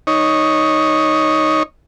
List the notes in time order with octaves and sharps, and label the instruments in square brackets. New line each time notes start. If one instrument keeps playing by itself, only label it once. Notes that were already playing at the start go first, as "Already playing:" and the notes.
[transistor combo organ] D#4 C#5